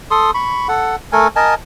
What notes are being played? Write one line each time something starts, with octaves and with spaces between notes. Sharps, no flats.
A4 C6 D#6
B5 C#6
A4 F#5
A3 A4 A#4 G#5
A#4 D#5 G#5 A5